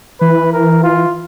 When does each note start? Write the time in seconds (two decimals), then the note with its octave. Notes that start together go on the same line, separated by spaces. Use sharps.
0.21 E3 B4
0.53 A#4
0.83 F4